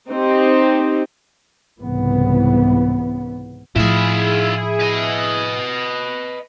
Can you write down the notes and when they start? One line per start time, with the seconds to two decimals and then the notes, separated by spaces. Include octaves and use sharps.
0.10 C4 D#4 G4
1.81 C2 G#2 C#3 E3 B3
3.76 A2 F3 E4 F4 G#4 E5
4.80 B4 D#5